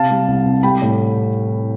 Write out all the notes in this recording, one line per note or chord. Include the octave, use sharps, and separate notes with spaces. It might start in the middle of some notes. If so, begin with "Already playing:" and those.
Already playing: C3 F5 A5
G3
C2
C2
G3 G5 B5
A2